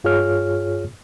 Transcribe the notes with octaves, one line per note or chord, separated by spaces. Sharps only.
G2 F4 G#4 C#5 F6